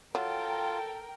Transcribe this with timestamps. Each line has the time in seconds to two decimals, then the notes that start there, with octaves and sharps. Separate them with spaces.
0.15 F#3 F4 A4 A#4 G5